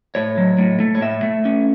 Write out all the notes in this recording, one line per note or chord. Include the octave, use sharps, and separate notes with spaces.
A2 C#5
F#3
A2
A3
C#5
A2 E5
A3
C#4